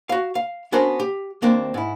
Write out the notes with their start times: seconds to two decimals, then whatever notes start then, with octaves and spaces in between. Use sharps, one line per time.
0.09 F#4 F5
0.35 F5
0.72 B3 C#4 D4 F#4 A#4 C5
1.00 G4
1.42 D#2 A#3 C4 D4
1.74 G#2 E4